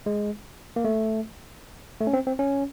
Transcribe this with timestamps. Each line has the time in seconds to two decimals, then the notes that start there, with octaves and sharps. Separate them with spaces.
0.06 G#3
0.76 A#3
0.85 A3
2.01 A3
2.07 C#4
2.13 C4
2.27 C4
2.39 C#4